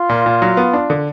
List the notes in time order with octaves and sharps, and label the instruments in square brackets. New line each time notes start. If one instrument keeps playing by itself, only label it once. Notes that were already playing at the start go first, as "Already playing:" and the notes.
Already playing: [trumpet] F4
[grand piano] A#2
A#2
F#3
B3
D4
D3